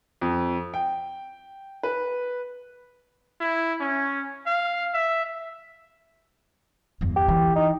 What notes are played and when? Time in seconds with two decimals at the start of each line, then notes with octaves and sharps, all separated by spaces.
0.22 F2
0.74 G5
1.83 B4
3.40 E4
3.80 C#4
4.46 F5
4.94 E5
7.01 E2 G2
7.16 G4
7.28 E3
7.56 D#4